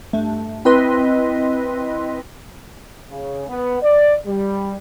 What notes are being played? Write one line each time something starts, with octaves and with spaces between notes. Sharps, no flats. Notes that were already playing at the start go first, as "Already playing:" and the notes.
G2 A3
C4 E4 B4 D#5 C6
C#3
B3
D5
G3